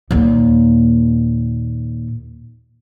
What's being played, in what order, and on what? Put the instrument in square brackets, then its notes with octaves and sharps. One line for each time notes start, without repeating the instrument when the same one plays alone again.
[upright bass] D#2 A#2